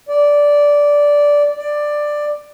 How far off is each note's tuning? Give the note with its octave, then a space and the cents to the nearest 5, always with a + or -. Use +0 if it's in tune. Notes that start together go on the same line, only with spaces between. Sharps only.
D5 -10
D5 +10